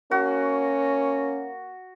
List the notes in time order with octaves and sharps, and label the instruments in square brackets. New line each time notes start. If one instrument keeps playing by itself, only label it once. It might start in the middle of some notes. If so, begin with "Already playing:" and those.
[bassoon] A#3 [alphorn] C#4 [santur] F#4